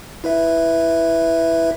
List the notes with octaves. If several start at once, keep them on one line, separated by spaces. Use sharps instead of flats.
E4 B4 E5